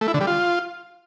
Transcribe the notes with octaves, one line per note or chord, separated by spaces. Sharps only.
A3
E4
D3
G3
F4